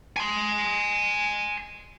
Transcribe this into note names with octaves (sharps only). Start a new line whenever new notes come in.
G#5 C6